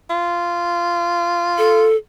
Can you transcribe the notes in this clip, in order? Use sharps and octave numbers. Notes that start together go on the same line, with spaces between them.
F4
A4